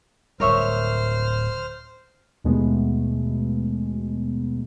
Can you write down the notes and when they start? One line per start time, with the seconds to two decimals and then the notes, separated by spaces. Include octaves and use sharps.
0.40 D1 G3 A#4 C5 C#5 E5 F6
2.44 D#2 B2 G#3 A3 B3